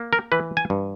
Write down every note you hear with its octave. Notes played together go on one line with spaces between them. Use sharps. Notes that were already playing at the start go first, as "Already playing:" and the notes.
Already playing: A#3
A#4
E3 B4
G#5
G2